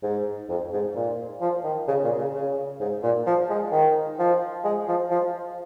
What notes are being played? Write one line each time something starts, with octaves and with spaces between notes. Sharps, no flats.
G#2
F2
G#2
A#2
F3
D#3
C#3
A#2
C#3
C#3
G#2
A#2
F3
G#3
D#3
F3
G#3
F3
F3